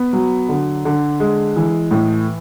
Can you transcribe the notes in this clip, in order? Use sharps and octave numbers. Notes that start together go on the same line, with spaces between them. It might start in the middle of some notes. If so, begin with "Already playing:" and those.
Already playing: B3
F#3
D3
D3
G#3
E3
A2